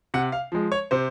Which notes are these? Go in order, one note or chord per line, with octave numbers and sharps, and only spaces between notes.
C3 F#5
F5
F3 G#3
C#5
C3 C5